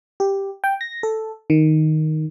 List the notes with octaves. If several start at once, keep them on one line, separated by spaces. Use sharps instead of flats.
G4
G5
A#6
A4
D#3